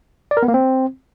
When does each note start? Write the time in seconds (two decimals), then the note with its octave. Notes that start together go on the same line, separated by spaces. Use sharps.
0.31 D5
0.37 A#4
0.43 B3
0.48 A#3
0.54 C4